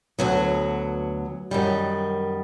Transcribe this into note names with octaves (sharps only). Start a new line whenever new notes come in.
D2 D3 F#3 B3
F#2 D#3 G3